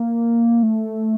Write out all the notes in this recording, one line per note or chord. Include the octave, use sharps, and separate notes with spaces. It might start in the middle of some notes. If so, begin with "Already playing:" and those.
Already playing: A#3
A3